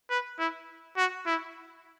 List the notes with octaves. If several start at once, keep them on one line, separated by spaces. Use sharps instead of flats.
B4
E4
F#4
E4